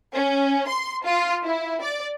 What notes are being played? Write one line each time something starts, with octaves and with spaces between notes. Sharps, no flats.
C#4
C6
F4
E4
D5